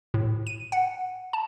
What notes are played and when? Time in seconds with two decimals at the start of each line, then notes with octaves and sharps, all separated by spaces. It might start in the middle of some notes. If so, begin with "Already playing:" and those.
0.14 A2
0.47 D#7
0.72 F#5
1.33 A5